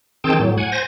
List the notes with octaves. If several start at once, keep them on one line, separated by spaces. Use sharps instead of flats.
D#3 C4 G#4 G5 A5
A2 F#3
F#5 G#5
C5 G#5 A#6